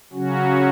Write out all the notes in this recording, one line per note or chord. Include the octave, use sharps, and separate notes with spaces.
C#3 F#3 C#4 F#4